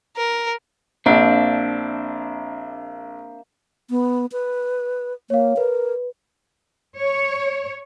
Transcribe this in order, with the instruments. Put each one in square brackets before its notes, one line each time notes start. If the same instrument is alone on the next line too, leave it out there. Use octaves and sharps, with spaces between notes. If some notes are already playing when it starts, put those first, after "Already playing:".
[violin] A#4
[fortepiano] A#1 [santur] A#3 E5 [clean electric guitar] C4 D4
[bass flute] B3
B4
[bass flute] A#3 [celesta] C#5 F5
[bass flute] A#4 [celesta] B4
[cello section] C#5